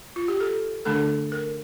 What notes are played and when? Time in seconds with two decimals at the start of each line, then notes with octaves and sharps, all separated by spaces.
0.16 F4
0.28 G4
0.40 A4
0.85 D3 A3 D4 A4
1.32 A#4